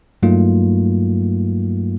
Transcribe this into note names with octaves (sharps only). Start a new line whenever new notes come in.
G2 F#3 A3 A#3 D#4 F4